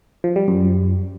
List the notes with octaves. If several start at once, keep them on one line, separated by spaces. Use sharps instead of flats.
F3
G3
F#2